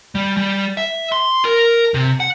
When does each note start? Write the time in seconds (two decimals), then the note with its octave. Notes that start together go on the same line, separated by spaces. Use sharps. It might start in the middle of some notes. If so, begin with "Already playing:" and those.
0.15 G3
0.37 G3
0.77 E5
1.12 C6
1.45 A#4
1.94 C3
2.20 F#5